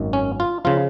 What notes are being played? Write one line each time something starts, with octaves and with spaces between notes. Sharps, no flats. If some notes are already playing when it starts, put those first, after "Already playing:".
Already playing: G#1 F#2 D#3
C#4
F4
C#3 F3 F4